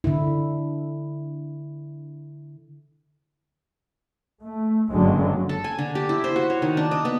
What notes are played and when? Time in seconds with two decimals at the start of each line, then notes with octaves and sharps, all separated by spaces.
0.04 D3 E4
4.41 A3
4.91 F#1 G2 D3 F#3 G#3 C#4
5.49 A4
5.64 G#5
5.79 D3
5.95 G4
6.09 E4
6.24 C5
6.36 F#4
6.50 C#5
6.62 D#3
6.77 D4
6.91 D#5
7.05 B3